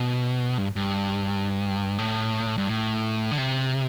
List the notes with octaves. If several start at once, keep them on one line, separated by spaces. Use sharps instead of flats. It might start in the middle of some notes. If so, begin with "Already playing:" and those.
Already playing: B2
G2
G2
A2
G2
A2
D3
C3